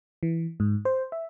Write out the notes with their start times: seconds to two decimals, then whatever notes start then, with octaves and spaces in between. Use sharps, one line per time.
0.23 E3
0.60 G#2
0.85 C5
1.12 E5